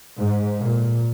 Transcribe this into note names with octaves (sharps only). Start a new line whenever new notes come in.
G#2
A#2